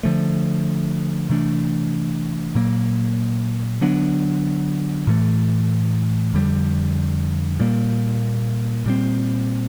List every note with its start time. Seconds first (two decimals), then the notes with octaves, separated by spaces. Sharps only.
0.03 D3 F3 A3
1.29 C3 E3 A3 D4
2.55 A#2 F#3 A#3
3.81 D3 F#3 B3 D4
5.07 A2 E3 A3
6.34 F2 D3 G3
7.59 A#2 G3 A#3
8.86 A#2 G3 C4